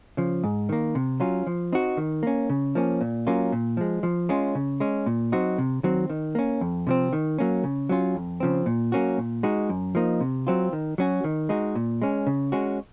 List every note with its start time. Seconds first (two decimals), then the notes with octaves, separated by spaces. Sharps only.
0.17 C#3 F3
0.44 G#2
0.69 D#3 A#3
0.95 C3
1.20 F#3 C#4 F4
1.47 F3
1.73 C4 D#4 F#4
1.97 D#3
2.23 A#3 C#4
2.50 C#3
2.75 F3 A#3 C#4
3.01 A#2
3.27 F#3 A#3 C#4 F4
3.52 A#2
3.77 F3 G#3
4.03 F3
4.29 G#3 C#4 F4
4.55 C#3
4.80 G#3 C#4
5.06 A#2
5.32 F#3 C4 D#4 F#4
5.58 C3
5.83 D#3 F#3 C4
6.10 D#3
6.35 A#3 C#4
6.61 F2
6.87 C3 F3 C4
7.13 D#3
7.39 F#3 A#3 C#4
7.64 C#3
7.89 F#3 C#4 F4
8.15 F2
8.40 C#3 F3 C4
8.66 A#2
8.92 F#3 A#3 C#4 F#4
9.18 A#2
9.43 G#3 D#4 F#4
9.69 F#2
9.95 F3 A#3 D#4
10.21 C3
10.47 F#3 C4 F4
10.73 D#3
10.98 F#3 C#4 F#4
11.24 D#3
11.49 G#3 D#4 F#4
11.75 A#2
12.02 G#3 C#4
12.27 C#3
12.52 G#3 C#4 F#4